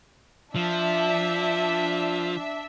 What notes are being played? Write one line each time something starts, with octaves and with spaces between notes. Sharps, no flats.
F3 D4 E5